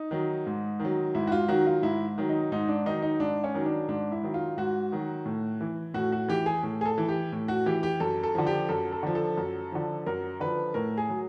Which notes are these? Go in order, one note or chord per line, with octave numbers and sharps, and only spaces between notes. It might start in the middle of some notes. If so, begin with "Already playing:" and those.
Already playing: D#4
D#3 F#3
G#2
D#3
F#3
G#2 E4
F#4
F4
D#3 F#3 F#4
F4
G#2 E4
D#3 F#3
D#4
G#2 D#4
D4
D#3 F#3 D#4
D#4
G#2 D4
C#4
D#3 F#3
D4
G#2 D4
E4
D#3 F#3
F4
G#2 F#4
D#3 F#3
A2
E3
A2 F#4
F#4
E3 G4
G#4
A2
G#4
A4
E3
G4
A2
F#4
E3 G4
G4
F#2 A4
A4
D3 F3
G4
F#2 A4
A4
D3 F3
A4
F#2
D3 F3
F#2 A#4
D3 F3 B4
A2 A#4
G#4
F#3